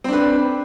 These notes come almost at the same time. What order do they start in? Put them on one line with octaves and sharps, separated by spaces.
C4 D4 B4